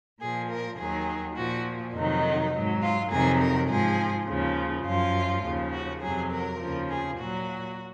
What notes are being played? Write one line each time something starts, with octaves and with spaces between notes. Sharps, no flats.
A#2 F3 G#4
A#4
D#2 D#3 F#3 G#4
A#2 F3 F#4
F2 C3 D#3 F#3 D#4
G#2 F#3
F4
F2 C3 D#3 F#3 G#4
A#4
G#2 F3 G#4
D#2 C#3 F3
F#2 F3 F4
D#2 C#3 F3
F#4
F2 C3 F#3 G#4
A#4
D#2 C#3 F3
G#4
A#2 F#3 F#4